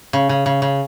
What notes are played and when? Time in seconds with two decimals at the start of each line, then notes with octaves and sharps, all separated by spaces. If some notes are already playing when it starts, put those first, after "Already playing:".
0.13 C#3
0.29 C#3
0.46 C#3
0.62 C#3